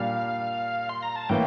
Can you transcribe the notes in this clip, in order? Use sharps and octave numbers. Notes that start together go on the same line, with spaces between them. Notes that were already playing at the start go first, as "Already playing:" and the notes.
Already playing: A#2 G3 D4 F5
C6
A#5
A5
A2 E3 A#3 G5